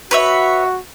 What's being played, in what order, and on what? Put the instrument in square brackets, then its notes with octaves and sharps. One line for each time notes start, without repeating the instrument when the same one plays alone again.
[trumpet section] F#4 [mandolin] B4 C#5 E5